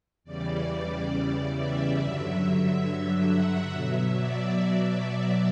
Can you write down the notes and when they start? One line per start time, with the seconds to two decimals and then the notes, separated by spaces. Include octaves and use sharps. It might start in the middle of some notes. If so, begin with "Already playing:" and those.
0.24 E2 C#3 E3 G3 D5
1.11 D5
1.54 E5
1.97 G2 D3 F#3 E5
2.84 E5
3.27 F#5
3.71 B2 F#3 E5
4.14 D5